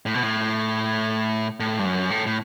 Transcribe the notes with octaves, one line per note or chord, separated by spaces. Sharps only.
A2
B2
A2
A2
G2
F#2
A2
A2